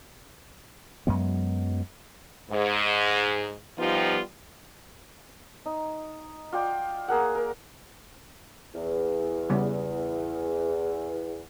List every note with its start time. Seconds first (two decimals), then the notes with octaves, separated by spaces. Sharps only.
1.07 F#2 F#3 G#3 B3
2.51 G#2
3.79 F3 G3 B3 D#4 F4 G4
5.66 D#4
6.52 F4 D5 G5
7.08 A#3 G#4 A#4 F#5
7.35 A#4
8.75 E2
9.50 C#3 G3 B3